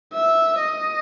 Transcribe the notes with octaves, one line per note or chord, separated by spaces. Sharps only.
E5
D#5